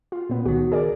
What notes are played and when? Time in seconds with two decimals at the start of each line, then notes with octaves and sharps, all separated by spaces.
0.12 F4
0.29 A#2 B3
0.46 C#2 D#3 F#4
0.72 G#4 A#4 D5